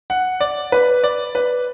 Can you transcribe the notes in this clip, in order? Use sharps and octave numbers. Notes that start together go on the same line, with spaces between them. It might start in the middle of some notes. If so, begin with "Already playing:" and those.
F#5
D5
B4
D5
B4